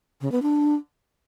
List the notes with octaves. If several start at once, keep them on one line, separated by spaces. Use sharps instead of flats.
C#3
B3
D4